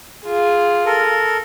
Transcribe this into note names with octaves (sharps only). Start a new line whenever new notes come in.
F4 G#4
A4 A#4